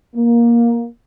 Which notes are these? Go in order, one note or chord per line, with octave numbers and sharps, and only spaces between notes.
A#3